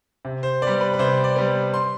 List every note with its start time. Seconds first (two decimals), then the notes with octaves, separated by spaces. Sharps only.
0.25 C3
0.43 C5
0.62 B3 D5
0.67 G3
0.81 B4
0.94 B4
0.99 C3 C5
1.24 D5
1.36 G3 B3
1.74 C6